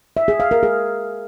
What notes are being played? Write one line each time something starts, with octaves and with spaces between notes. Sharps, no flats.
E5
G#4
F5
A#4
G#4